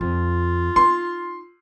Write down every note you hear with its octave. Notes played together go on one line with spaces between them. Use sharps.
F2 F4
D#4 C6